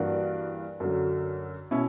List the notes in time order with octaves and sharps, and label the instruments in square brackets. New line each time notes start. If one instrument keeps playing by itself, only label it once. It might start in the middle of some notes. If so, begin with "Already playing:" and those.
Already playing: [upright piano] G2 E3 A#3 D4 F#4
F#2 D3 F#3
B2 C#4 E4